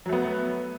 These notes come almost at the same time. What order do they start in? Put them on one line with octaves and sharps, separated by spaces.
F#3 A3 B3